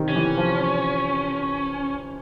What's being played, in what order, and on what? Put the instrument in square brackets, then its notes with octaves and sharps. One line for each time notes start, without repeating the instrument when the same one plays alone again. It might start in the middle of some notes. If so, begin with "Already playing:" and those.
Already playing: [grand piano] C3 D#3
[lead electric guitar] C#4
[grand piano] E3
F3